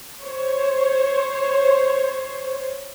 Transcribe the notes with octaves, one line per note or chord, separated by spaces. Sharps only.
C5 C#5